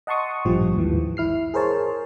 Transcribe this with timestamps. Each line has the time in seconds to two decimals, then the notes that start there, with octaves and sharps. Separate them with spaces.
0.07 D#5 F#5 A5 C6 C#6 D#6
0.45 A1 G2 A#2 F3 G4
0.74 D#2 G#2 E3
1.17 E4 F6 C7
1.54 G#4 A#4 C5 C#5 A5